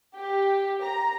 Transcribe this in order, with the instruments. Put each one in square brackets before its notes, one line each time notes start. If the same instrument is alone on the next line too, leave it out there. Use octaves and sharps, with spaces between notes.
[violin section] G4
A#5